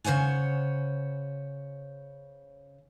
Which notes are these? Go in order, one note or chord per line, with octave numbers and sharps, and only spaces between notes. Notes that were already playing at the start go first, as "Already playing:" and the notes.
C#3 C5 C#5 F#5 G#5